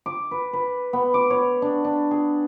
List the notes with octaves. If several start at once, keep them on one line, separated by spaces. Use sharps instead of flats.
D6
B4
B4
B3
D6
C#5
D4
D4
G#4